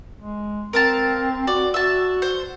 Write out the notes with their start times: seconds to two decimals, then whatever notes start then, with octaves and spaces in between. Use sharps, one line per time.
0.19 G#3
0.73 C4 A#4 F5 A5
1.47 F#4 D5
1.74 F#4 E5 A5
2.22 C5